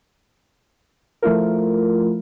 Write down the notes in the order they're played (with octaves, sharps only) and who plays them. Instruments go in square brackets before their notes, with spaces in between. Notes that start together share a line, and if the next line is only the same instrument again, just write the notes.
[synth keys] F3 A3 E4 F4 A#4